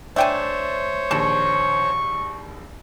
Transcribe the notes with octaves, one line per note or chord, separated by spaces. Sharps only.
A3 D4 C5 C#5 G5 G#5
A#1 D#2 A5 C#6